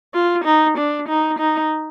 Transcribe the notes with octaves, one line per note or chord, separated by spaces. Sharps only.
F4
D#4
D4
D#4
D#4